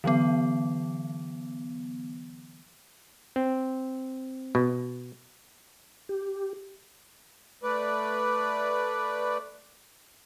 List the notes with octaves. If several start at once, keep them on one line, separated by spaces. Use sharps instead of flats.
D3 E3 F#3 B3
C4
B2
G4
A3 B4 D5